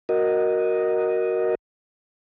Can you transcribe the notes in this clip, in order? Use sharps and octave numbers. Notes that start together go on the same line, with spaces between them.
F#4 A#4 D#5